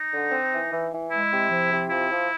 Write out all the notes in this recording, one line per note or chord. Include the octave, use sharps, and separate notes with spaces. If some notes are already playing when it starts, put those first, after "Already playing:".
Already playing: D#4
D3
C4
E3
E3
E3
G#3 E4
C3
F3
C3
F3 E4
F3